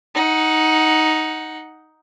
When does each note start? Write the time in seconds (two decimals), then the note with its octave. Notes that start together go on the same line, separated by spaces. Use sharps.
0.15 D#4 F#5